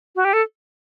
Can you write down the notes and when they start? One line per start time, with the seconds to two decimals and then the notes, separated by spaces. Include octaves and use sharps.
0.16 F#4
0.25 G4
0.33 A4